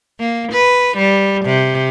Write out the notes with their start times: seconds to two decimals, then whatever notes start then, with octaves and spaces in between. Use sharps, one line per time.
0.20 A#3
0.52 B4
0.98 G3
1.46 C3